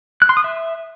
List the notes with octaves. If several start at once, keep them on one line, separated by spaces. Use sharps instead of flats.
F#6
C6
D#6
E5